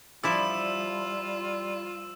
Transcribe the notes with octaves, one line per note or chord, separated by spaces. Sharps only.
F3 G3 E4 F4 D5 E6 E7